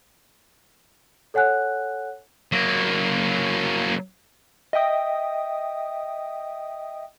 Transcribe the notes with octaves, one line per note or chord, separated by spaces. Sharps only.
A4 C#5 F#5 G#5 F#6
F#3 A#3
D#5 E5 G5 D#6